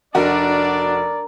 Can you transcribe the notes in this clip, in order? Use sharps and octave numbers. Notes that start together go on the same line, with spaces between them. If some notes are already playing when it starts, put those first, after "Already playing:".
F1 D4 F#4 A#4 D5